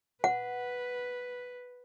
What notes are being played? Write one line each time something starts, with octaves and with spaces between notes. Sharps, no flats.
B4 F#5